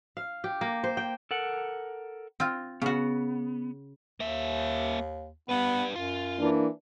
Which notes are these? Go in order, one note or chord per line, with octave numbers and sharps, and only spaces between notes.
F5
G4
A#3
C5
G5
A4 A#4 F#5
C4 F4
C#3 B3 F#4
D#2 A#3 E5
G3 B3 B4
F#2 F4
E3 A#3 D4